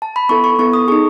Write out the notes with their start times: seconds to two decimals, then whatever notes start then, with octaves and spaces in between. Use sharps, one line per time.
0.02 A5
0.16 B5
0.29 B3 E4 A4 C#6
0.44 C#6
0.59 B3 E4 A4 C#6
0.73 D#6
0.88 D#4 G#4 C#6